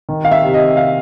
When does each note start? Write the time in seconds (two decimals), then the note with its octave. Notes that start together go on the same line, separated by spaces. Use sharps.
0.09 D#3
0.25 F5
0.32 E5
0.43 C3
0.54 D#5
0.77 F5